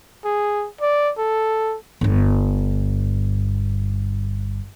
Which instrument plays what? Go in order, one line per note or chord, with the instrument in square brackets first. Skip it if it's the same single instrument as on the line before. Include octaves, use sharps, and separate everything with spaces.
[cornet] G#4
D5
A4
[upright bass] G1 G2